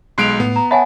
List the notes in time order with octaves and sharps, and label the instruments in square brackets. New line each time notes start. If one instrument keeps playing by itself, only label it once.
[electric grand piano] B1 G#3 D7 [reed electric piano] C6 F#6 [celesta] C7 F7
[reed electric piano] A2 [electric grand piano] B3
[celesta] A#5
[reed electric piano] C#5 A5 B5 [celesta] E5 F#5 G#5